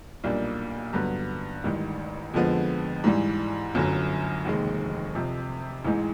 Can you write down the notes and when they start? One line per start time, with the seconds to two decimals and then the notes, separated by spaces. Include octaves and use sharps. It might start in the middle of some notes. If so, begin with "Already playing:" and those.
0.24 B1 A#2 G3 A#3 D4
0.93 G2 D3 F#3 B3
1.64 A1 G#2 D#3 G3
2.34 F2 D3 F3 G#3 B3
3.04 G#2 E3 G3
3.74 G1 F#2 D3 F#3
4.45 F1 D#2 D#3 G#3
5.15 F2 C3 F3
5.85 A1 G#2 E3 G#3